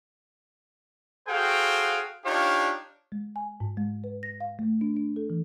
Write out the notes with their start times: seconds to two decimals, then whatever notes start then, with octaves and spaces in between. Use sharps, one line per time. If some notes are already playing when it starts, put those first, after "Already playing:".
1.28 F#4 G#4 A4 C5 F5 G5
2.25 D4 D#4 F4 G4 C#5 F5
3.12 G#3
3.36 G#5
3.60 G#2
3.77 G#3
4.04 B4
4.23 A#6
4.40 F5
4.59 A3
4.81 D4
4.97 D4
5.16 A4
5.30 E3